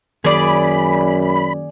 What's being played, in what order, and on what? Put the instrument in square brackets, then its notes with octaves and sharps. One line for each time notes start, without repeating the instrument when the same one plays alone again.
[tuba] F#2 [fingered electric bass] D#3 A#3 C#4 [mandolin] G#4 D5 [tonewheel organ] B5